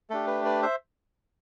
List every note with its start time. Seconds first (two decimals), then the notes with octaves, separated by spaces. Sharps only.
0.10 A3 D4 G4 A4
0.27 B4
0.45 B4 D5
0.62 C5 E5